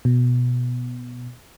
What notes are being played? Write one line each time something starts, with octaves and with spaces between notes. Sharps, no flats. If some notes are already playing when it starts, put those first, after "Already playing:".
B2